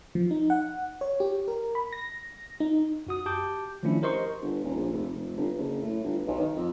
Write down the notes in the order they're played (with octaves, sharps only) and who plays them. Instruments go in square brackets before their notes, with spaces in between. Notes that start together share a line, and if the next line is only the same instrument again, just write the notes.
[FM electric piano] F3
D#4
F#5
C#5
G4
A#4
B5
A#6
D#4
[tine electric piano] F#2 F#4 D#6
G4 A5 D6 G6
D#3 F3 A3 C#4 D4 E4
G4 A#4 C5 D#5 C6 C#6
[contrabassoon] G1
D#1
A#1
F1
F1
G1
F#1
A2
G1
B1
D#3
F2